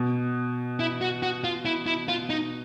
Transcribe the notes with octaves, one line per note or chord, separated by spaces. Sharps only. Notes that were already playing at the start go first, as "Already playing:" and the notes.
Already playing: B2
E4
F#4
F#4
F4
E4
E4
F4
D#4